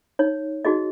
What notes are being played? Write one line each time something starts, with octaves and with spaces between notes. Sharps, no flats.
D#4 C#5
D#4 F#4 G#4 D#5